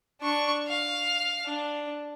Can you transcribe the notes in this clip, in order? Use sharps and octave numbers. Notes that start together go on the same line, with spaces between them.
D4 C#6
F5
D4